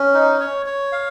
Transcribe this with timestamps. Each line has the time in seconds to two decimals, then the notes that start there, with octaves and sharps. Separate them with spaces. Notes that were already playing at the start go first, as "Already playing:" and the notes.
Already playing: C#4
0.14 D#4
0.40 C#5
0.66 C#5
0.92 F5